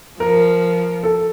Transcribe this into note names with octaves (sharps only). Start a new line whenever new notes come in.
F3 A#4
A4